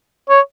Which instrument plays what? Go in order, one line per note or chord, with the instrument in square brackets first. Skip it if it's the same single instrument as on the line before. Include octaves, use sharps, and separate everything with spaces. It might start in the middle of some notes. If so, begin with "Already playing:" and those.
[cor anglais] C#5